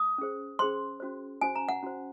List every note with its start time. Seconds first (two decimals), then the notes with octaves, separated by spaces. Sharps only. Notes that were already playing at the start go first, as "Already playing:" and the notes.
Already playing: D#6
0.18 C#4 G#4 C5
0.59 C#4 G#4 C5 C6
1.00 C#4 F#4 C5
1.41 C#4 F#4 C5 G#5
1.56 A#5
1.69 F#5
1.83 C#4 F#4 C5